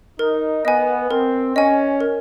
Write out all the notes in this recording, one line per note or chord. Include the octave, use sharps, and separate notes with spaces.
D#4 A#4
B3 D#5 G#5
C4 A#4
C#4 D#5 G#5
A#4